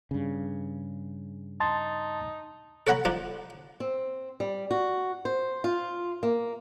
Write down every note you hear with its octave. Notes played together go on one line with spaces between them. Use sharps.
G2 C#3
D#4 A5 C6 A6
A4 C#5 F#5 A#5 B5
F3 D4 D#4
C4
G3
F#4
C5
F4
A#3